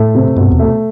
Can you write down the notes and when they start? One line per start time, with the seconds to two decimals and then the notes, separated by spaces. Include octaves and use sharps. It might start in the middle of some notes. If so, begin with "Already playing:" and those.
Already playing: A2 A3
0.15 C3
0.37 G2 B2
0.52 E2
0.59 A3